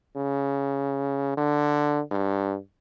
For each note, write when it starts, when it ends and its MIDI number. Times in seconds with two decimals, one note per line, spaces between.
0.16 1.34 49
1.37 2.00 50
2.11 2.57 43